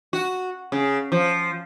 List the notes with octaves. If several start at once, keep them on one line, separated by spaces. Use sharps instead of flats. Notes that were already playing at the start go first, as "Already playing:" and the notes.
F#4
C#3
F3